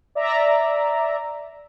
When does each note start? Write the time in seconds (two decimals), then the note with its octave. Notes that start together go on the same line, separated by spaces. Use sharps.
0.15 D5 E5 A#5